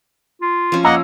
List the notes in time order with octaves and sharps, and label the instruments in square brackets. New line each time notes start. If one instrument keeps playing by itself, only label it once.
[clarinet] F4
[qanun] F3 C#4
[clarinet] A#3 [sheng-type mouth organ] D#5 F#5 [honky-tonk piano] A#5 E6